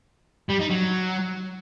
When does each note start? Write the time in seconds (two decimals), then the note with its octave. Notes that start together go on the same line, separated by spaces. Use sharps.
0.49 G3
0.59 D#4
0.70 F#3